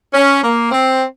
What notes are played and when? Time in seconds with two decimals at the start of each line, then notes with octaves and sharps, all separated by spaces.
0.14 C#4
0.43 A#3
0.72 C4